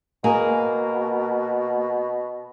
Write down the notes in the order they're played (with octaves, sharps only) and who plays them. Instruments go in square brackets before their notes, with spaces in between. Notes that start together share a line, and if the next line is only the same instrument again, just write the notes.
[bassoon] B2 [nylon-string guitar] A#3 G#4 A#4